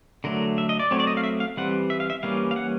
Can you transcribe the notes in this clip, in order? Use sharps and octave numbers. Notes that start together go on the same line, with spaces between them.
D3 F#3 A3 A#4
E5
D#5
D5
F#3 A3 C4 C#5
D5
D#5
F5
E5
F5
E3 G3 C4 F#5
E5
F5
E5
E3 G3 A#3 C#4 F5
F5
F#5